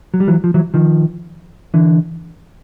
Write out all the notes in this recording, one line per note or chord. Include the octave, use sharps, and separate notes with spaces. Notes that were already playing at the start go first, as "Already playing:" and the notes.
F#3
G3
E3 F#3
F3
E3 F#3
D#3 F3
D3 E3